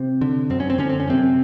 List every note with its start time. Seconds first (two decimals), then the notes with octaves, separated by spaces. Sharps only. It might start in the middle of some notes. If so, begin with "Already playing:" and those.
Already playing: C3 C4
0.21 D3
0.50 F#2 C4
0.60 C#4
0.70 C4
0.78 D3 C#4
0.89 C4
1.00 C#4
1.07 F#2 C3 C4